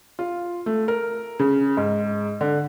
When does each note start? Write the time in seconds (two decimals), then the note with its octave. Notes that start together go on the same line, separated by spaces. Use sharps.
0.19 F4
0.66 A3
0.88 A#4
1.39 C#3
1.77 G#2
2.41 D3